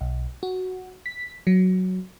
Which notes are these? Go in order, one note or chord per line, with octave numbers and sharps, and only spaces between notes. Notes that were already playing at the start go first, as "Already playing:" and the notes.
B1
F#4
B6
F#3